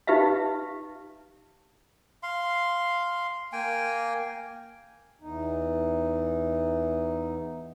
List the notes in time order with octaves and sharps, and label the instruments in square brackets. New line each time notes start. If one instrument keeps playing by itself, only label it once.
[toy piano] D#4 G4 B4 E5 F5
[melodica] F5 C6
A#3 G5 G#5
[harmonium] E2 D#4